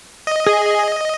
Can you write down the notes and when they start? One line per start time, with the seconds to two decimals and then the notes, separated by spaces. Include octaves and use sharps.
0.27 D#5
0.46 G#4